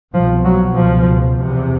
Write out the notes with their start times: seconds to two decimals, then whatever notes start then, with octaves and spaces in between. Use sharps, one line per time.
0.13 C2 B2 F3
0.45 F#3
0.76 C#2 B2 F3
1.39 E2 C3